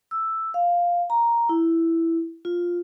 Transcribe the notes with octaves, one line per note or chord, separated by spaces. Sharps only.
E6
F5
A#5
E4
F4